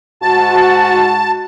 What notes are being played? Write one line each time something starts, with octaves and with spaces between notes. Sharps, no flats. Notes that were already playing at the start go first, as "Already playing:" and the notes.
G#2 F#4 A5